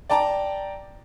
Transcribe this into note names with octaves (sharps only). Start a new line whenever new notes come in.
D5 G5 A5 A#5